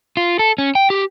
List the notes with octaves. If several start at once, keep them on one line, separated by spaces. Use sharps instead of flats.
F4
A4
C#4
G5
G4